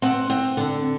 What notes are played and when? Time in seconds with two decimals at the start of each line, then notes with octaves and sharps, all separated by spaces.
0.02 C4 F#5
0.30 C4
0.57 D3